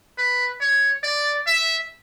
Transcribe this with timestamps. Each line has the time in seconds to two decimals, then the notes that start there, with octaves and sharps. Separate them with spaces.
0.18 B4
0.61 C#5
1.03 D5
1.47 E5